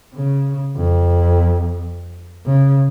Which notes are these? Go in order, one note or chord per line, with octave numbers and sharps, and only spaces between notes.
C#3
F2
C#3